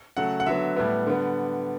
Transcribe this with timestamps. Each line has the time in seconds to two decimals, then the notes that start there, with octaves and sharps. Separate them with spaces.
0.17 C#3 F#3 A3 F#5
0.40 F#5
0.46 D3 F#3 B3 E5
0.76 A2 G3 B3
1.06 D3 G3 B3